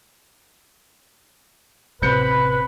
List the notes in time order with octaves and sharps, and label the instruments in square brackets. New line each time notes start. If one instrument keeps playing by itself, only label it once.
[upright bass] A1 C3 [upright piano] C4 G6 C#7 [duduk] B4 [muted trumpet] B5